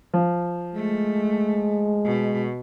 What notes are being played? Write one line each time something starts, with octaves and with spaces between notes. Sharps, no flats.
F3
G#3 A3
B2